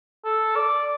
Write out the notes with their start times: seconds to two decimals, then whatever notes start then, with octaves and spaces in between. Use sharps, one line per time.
0.25 A4
0.56 D5